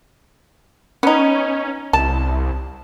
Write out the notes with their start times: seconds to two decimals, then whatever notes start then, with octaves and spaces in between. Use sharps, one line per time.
1.03 B3 C#4 D#4
1.93 C2 A5